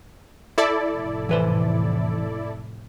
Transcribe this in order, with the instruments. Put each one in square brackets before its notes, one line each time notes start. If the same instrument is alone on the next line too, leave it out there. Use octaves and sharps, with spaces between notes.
[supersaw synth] E4 A4 D5
[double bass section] F1 A2
[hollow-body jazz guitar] E3 B4 C5